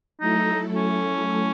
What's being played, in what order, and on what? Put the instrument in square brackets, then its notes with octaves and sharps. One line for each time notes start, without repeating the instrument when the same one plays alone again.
[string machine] F#3 A3 E4 A4 [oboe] D#4
[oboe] C#4